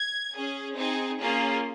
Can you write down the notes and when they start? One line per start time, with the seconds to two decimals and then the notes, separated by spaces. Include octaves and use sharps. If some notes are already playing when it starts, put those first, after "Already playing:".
Already playing: G#6
0.34 C#4 G#4
0.76 C4 D#4 G#4
1.19 A#3 C#4 F4 G#4